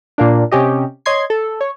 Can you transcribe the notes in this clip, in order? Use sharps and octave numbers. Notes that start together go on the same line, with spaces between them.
A#2 A#3 D4
C3 C#4 G4 D#5
C#5 D#5 C6 G#6 C7
A4
C#5